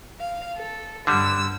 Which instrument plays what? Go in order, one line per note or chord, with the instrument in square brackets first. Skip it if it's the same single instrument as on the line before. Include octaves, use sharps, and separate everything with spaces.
[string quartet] F5
A4
[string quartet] G2 E6 [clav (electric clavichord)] D3 G3